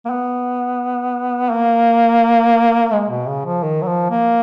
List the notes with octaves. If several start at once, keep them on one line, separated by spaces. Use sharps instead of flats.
A#3
B3
A#3
G#3
B2
C#3
F3
D#3
F#3
F3
A#3